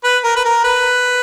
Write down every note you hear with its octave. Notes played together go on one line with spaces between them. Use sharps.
B4
A#4
B4
A#4
B4